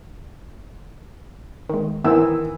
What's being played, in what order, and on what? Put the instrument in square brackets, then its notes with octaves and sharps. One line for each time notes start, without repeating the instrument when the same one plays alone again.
[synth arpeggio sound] D#3 G#3
[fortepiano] D#3 E3 E6 [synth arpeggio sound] B3 A#4 C5